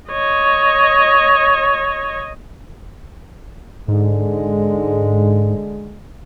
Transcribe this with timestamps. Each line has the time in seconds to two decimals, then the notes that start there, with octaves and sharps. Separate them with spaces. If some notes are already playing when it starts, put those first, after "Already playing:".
0.11 C#5 D#5
3.88 G#2 D3 G#3